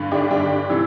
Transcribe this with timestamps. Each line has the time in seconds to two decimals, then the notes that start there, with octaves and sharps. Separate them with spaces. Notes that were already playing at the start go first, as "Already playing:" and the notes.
Already playing: G2 D3
0.11 D4 G4
0.31 G2 D3 D4 G4
0.69 C3 E3